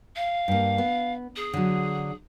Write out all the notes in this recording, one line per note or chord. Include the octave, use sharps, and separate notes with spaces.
F5
G2 A#3
B3
G#4
D3 F#3